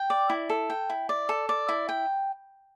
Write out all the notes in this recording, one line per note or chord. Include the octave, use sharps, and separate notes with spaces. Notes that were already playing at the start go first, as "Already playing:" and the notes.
Already playing: G5
D5
E4
A4
G5
E4
D5
A4
D5
E4
G5